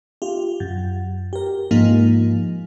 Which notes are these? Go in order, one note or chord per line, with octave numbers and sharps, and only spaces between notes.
F4 G4
F#2
G4 A#4
G#2 F3 A#3 D#4 F4